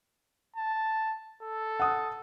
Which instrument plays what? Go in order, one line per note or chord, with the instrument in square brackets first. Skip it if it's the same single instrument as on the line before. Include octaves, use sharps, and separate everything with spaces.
[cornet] A5
A4
[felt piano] F#5 D#6